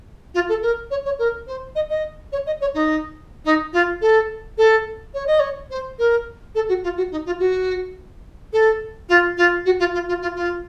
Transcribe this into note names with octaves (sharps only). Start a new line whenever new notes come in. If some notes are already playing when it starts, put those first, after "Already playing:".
F4
A4
A#4
C#5
C#5
A#4
C5
D#5
D#5
C#5
D#5
C#5
D#4
D#4
F4
A4
A4
C#5
D#5
C#5
C5
A#4
A4
F#4
F4
F#4
D#4
F4
F#4
A4
F4
F4
F#4
F4
F4
F4
F4
F4